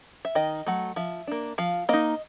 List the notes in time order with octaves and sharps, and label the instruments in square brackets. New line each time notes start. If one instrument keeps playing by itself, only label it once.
[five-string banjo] E5
D#3 D#5
F#3 A3
F3 E5
A#3 D4
F3 F5
A#3 D#4 D#5